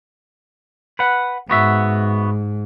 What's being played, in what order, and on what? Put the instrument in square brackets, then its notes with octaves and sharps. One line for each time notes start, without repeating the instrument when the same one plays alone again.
[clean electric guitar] B4 F#5
[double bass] G#2 [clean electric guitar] B3 F#4 E5